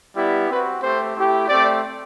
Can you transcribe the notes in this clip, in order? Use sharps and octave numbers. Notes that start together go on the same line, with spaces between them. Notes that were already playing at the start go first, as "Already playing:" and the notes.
G3 B3 E4 G4
C4 F#4 B4
A3 C4 G4 C5
A3 E4 G4
A3 C4 G4 D5